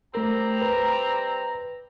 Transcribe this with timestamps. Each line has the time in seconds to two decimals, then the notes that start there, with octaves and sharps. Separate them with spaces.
0.15 G3 A3 C4 A#4 A#5
0.62 B4